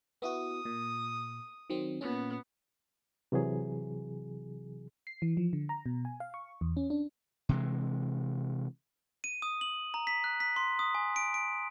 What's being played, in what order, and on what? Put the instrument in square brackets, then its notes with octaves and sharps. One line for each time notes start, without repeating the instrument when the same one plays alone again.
[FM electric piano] B3 E4 F#4 [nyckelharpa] D#6
[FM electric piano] A#2
D#3 F#3 C4
[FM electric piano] A#2 C#4 [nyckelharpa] B3
[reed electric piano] C3 E3 F#3 G#4
[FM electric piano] C7
E3
F3
D3
A#5
B2
G#5
F5
C#6
E2
C#4
D4
[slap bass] C3 E3 G#3
[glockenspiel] D#7
D#6
F#7
A#5
B6
F#6
B6
C6
D#6
G#5
D7
D7